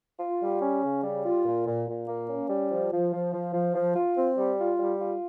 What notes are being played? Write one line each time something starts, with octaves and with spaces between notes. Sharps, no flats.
F4
G3
C#4
C#3
G3
F4
A#2
A#2
A#2
A#3
C#4
G3
F3
F3
F3
F3
F3
F3
F4
C4
G3
F4
G3
F4